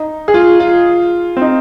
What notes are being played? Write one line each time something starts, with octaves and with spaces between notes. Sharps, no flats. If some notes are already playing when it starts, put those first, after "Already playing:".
Already playing: D#4
G#4
F4
F4
C4
D#4